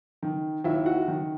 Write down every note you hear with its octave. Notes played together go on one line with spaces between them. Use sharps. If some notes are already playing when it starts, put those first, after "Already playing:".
D#3
D#2 E4 E5
F#4 F#5
D#3